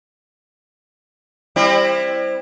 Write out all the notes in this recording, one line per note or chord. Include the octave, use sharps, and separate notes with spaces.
G3 C4 E4